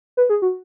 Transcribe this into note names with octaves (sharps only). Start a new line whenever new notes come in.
B4
G#4
F#4